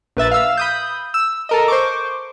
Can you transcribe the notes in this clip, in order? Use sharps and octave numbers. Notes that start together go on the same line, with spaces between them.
A#1 B4 E5 A6
F5 E6
B5 D#6 G6
E6
A4 A#4 D#5
C5 C#6 D6